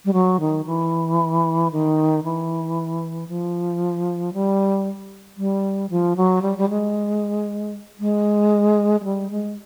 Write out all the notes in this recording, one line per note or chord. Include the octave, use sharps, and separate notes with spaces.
G3
F#3
D#3
E3
D#3
E3
F3
G3
G3
F3
F#3
G3
G3
G#3
G#3
G#3
G3
G#3